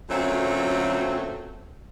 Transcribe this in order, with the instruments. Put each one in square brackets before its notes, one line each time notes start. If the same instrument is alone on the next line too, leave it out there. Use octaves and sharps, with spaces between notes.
[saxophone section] F#2 A#2 D3 F#3 A3 C4